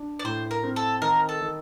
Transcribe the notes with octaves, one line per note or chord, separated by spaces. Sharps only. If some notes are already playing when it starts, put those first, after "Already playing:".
Already playing: D4
D5
A2 C5
A#4
C4
A4
D#3 A#4
A4
D#3